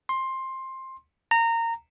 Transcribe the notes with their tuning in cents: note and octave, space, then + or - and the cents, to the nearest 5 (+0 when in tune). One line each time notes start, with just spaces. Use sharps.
C6 +15
A#5 -20